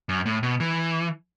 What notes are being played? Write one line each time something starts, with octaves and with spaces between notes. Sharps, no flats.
F#2
A2
B2
E3